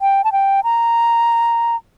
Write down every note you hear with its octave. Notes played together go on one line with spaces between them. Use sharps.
G5
A5
G5
A#5